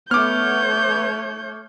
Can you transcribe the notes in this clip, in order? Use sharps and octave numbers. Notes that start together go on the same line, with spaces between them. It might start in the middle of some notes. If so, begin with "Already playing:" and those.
A3 B3 C#5 D6 F6 G6